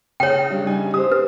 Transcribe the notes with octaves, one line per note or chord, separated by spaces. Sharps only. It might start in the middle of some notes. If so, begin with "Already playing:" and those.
C#3 C#5 G5
C#3 G3 D4
D#4 G#5
G4 C5 D#6
B4